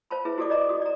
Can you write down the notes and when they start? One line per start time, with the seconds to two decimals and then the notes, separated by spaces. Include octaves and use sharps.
0.11 C5 F5 A5 B5
0.25 E4 G#4 B4 E5
0.37 E4 F#4 G4 A4 D5 D6
0.50 D5 D#5 A#5 D6
0.69 F#4 D#6
0.82 D5 A#5